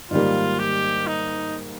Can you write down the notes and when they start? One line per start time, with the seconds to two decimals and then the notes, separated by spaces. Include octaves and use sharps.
0.11 G#2 D#3 G3 A#3 F4
0.59 G4
1.07 D#4